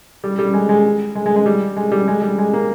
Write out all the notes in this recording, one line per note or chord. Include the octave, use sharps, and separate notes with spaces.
G3
G3
G#3
G#3
G#3
G#3
G#3
G3
G#3
G3
G#3
G3
G#3
A#3